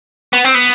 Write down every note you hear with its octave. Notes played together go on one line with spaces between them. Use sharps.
B3
C4
B3